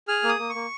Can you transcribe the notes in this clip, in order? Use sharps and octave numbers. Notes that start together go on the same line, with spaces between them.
G#4 F6
A#3
D#6
A#3
C#6
A#3